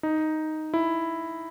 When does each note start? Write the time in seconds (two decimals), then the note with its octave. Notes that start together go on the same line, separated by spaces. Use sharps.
0.03 D#4
0.74 E4